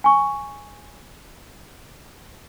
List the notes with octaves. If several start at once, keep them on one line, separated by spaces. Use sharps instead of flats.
G#5 C#6